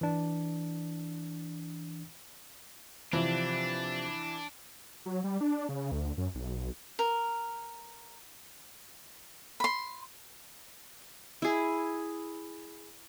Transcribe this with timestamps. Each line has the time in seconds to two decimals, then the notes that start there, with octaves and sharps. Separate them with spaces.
0.01 E3 D4
3.13 C3 E3 F3 D4
5.06 F#3
5.24 G3
5.41 D4
5.69 C#3
5.92 D2
6.18 F#2
6.35 B1
6.99 A#4
9.60 B5 C6
11.42 E4 G#4